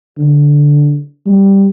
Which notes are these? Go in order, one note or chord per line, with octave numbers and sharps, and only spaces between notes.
D3
G3